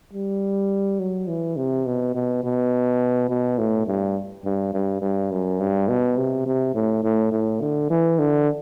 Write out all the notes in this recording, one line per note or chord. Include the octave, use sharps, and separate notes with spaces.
G3
F#3
E3
C3
B2
B2
B2
B2
A2
G2
G2
G2
G2
F#2
G2
B2
C3
C3
A2
A2
A2
D3
E3
D3